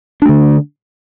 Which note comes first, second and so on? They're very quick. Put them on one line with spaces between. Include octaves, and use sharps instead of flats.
D4 A3 D3